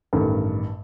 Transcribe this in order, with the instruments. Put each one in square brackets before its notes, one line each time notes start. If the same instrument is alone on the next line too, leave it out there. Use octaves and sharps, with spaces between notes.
[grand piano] A1 G2 D#3 A4